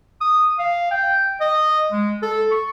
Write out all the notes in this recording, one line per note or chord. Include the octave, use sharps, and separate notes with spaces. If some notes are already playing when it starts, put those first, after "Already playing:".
D#6
F5
G5
D#5
G#3
A4
C#6